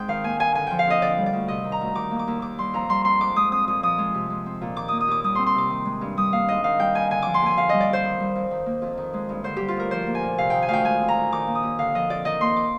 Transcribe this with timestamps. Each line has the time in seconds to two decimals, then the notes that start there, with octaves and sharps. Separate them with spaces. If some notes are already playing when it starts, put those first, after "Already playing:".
Already playing: G#2 G#3 C4 G5
0.08 D#3 F5
0.24 A#3 G#5
0.39 G2 G#5
0.55 D3 G#5
0.67 F3 G5
0.79 F5
0.87 F2 D#5
1.02 D3 D5
1.18 G3
1.26 D5
1.33 D2
1.48 C3 D#5
1.64 D#3
1.72 A#5
1.81 D2
1.95 D#3 D6
2.11 A#3
2.19 D6
2.28 D#2
2.42 D#3 D6
2.58 G3 C6
2.74 F2 A#5
2.89 G3 C6
3.05 C4 C6
3.20 G#2 D6
3.36 G#3 D#6
3.52 C4 D#6
3.67 A#2 D#6
3.83 F3 D#6
3.98 G#3
4.14 C3
4.30 G#3
4.46 C4
4.61 A#2
4.77 D#3 D6
4.88 A#3 D#6
5.00 D#6
5.08 D#2 D6
5.24 G3 D#6
5.35 C4 C6
5.46 C6
5.55 C3 D6
5.70 D#3
5.85 G#3
6.01 G2
6.17 G3 D#6
6.33 A#3 F5
6.48 G#2 D#5
6.64 D#3 F5
6.79 G3 G5
6.95 G2 G#5
7.11 D3 G#5
7.22 F3 D6
7.34 C6
7.41 D#2 G#5
7.57 D3 F5
7.69 G3 D#5
7.80 D5
7.89 F2 C5
8.04 D#3
8.20 G3
8.35 F2
8.51 D#3
8.66 A#3
8.82 F2
8.97 D#3
9.14 G#3
9.29 G2
9.44 D3 C5
9.57 G3 G4
9.68 F4
9.76 D2 A#4
9.91 F3 C5
10.07 A#3
10.15 G#5
10.23 A#2
10.38 C3 F5
10.50 D#3 G5
10.62 G#5
10.69 D2 F5 G5
10.84 G#3 G#5
11.01 C4
11.08 A#5
11.17 A#2
11.32 D#3 D6
11.47 A#3
11.55 D#6
11.63 D#2
11.78 D3 F5
11.95 F3 D#5
12.10 F2 D5
12.25 D#3 D#5
12.41 A#3 C6
12.56 D6